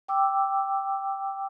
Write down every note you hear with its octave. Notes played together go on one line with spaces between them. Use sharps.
G5 D6 E6